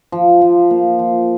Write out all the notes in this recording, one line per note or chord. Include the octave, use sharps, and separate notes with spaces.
F3
F3
A#3
F3